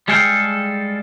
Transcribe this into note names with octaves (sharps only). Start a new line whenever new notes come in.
G3 G#3 G#4 A4 F5 G5